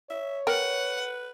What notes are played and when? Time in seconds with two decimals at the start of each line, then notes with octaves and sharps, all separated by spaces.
0.10 C#5 E5
0.47 A#4 B4 F#5 G5